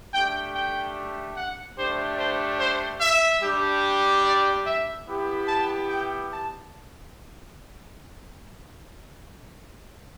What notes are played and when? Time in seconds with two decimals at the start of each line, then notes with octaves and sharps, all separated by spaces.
0.13 A3 D4 G4 G5
0.54 G5
1.36 F#5
1.77 A3 D4 G4 C5
2.18 C5
2.59 C5
3.01 E5
3.41 G3 D4 G4
4.24 D5
4.65 E5
5.07 B3 E4 G4
5.47 A5
5.88 G5
6.30 A5